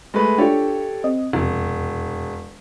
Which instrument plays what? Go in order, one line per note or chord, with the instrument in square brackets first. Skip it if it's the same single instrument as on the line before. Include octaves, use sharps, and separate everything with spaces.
[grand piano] G#3 A3 B4
[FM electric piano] D4 F4 [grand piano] G4 A4 C#5
[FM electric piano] C4 D#5
[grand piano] E1 [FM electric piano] F2 C3